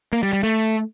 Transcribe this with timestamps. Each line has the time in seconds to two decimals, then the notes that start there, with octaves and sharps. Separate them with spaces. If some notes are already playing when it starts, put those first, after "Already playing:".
0.13 A#3
0.23 G3
0.33 G3
0.43 A3